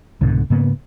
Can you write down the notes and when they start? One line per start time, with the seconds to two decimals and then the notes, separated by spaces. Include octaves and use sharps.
0.21 C2 G#2 B2 D3
0.50 G#2 C#3 A#3 B3